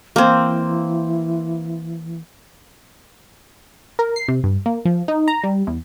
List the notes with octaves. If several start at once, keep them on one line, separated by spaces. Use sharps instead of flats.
E3 A#3 C4
A#4
C7
C3
G2
A#3
F3
D#4
A#5
G3
E2